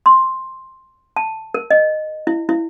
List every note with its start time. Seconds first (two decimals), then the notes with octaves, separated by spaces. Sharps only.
0.06 C6
1.16 A5
1.54 A#4
1.71 D#5
2.27 E4
2.49 E4